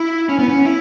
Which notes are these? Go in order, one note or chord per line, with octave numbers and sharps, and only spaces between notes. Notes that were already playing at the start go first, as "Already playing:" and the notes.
Already playing: E4
C#4
B3
C#4
E4